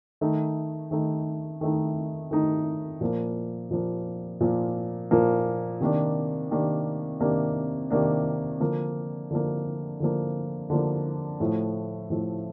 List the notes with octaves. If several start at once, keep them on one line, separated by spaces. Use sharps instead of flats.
D#3 A3 D#4
D#3 A3 D#4
D#3 A3 D#4
D#3 A3 D#4
A#2 F3 A#3
A#2 F3 A#3
A#2 F3 A#3
A#2 F3 A#3
C3 D#3 A#3 D4
C3 D#3 A#3 D4
C3 D#3 A#3 D4
C3 D#3 A#3 D4
D3 F3 A#3
D3 F3 A#3
D3 F3 A#3
D3 F3 A#3
A2 F3 A3
A2 F3 A3